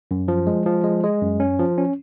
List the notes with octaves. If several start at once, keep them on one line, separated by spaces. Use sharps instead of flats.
F#2
F3
G#3
F3
G#3
G#3
F#2
C#4
F3
C#4